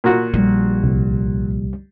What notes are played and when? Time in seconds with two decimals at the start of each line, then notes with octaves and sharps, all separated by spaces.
0.04 A#2 F#4
0.34 A#1 G3
0.83 C2